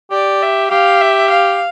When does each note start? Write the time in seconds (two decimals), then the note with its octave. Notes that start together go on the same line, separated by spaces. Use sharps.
0.11 G4 D5
0.42 E5
0.71 G4 F5
1.01 E5
1.30 F5